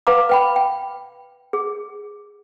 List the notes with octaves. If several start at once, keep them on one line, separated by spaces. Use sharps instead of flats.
B4 F5 A#5 D6
B4 G5 B5
G5
G#4